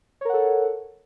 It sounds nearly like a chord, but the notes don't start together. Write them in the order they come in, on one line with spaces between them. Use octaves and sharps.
C#5 A#4 F#5 A4